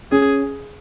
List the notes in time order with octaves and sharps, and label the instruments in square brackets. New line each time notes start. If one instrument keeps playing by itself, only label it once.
[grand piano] C#4 [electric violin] G#4